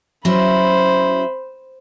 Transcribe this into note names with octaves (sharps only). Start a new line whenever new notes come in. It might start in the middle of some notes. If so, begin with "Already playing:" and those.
F#3 C#4 E4 C5 B5